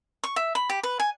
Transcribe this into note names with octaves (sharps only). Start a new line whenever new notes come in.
C#6
E5
B5
G4
B4
G#5